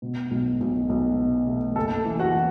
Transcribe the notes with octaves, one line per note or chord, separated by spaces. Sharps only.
B2
B1
B1
B1
B2
A3
F#1 A4 A5
E3
F#4 F#5
E3